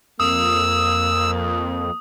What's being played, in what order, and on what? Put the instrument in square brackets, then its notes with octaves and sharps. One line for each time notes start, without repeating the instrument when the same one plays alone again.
[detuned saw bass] F2 [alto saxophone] A#3 [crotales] D#6 [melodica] E6